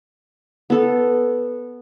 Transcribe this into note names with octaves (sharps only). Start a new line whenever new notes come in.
B3 A4